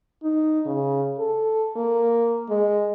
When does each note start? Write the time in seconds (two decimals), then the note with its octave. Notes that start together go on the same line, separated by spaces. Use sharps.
0.23 D#4
0.66 C#3
1.18 A4
1.76 A#3
2.50 G#3